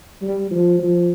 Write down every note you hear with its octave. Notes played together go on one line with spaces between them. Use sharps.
G3
F3
F3